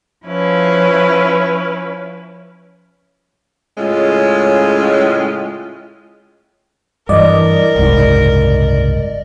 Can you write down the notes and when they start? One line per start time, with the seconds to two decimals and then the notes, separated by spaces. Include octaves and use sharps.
0.25 F3 C#4 E4 B4
3.77 A2 C#3 G#3 C#4 F4
7.09 G2 E3 A#4 D5 D#5
7.76 F#1 C2 G#2